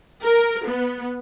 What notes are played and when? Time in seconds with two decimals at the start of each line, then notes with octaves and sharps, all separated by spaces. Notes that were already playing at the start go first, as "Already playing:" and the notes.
0.23 A#4
0.66 B3